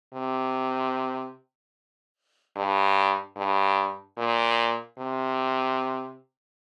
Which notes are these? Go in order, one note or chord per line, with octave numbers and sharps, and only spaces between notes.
C3
G2
G2
A#2
C3